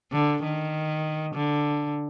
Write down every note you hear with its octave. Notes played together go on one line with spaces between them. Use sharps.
D3
D#3
D3